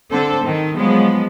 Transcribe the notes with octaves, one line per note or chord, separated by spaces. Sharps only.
D3 C4 A4 C5
D#3 C4
F3 F#3 G#3 B3